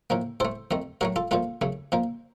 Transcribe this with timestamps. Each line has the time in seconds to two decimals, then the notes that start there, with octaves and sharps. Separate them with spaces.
0.10 A2 F3 A#3
0.40 A2 A3 A4 C5
0.71 F2 D#3 A3
1.01 A2 F#3 A3 F#4 A#4
1.16 F4 A4
1.31 A#2 F3 A3 F4 A4
1.61 F#2 C#3 A3
1.92 A#2 F3 A#3